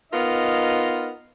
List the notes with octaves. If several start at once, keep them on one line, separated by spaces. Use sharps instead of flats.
B3 D#4 F4 A#4 D#5